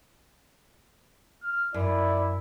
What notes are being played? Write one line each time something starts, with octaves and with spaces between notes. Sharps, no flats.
F6
F#2 E4 D5